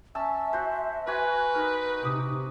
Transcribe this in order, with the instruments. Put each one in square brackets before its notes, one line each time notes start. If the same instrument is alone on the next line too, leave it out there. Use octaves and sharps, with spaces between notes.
[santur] C#4 A5 E6 [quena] E5
[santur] F#4 C5
[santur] F#4 G#5 [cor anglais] B4
[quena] D#4 [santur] A#4
[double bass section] C3 [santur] D6 D#6